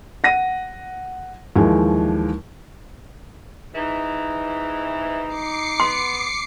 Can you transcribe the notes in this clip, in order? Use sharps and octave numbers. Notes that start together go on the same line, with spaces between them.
F#5 A#6 D#7
D#2 E3 F3 G#3
G#2 E3 D#4
D6 C7 C#7
B3 C6